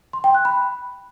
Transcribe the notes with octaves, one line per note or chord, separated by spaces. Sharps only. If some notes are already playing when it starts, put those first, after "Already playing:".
C6
G5
F#6
B5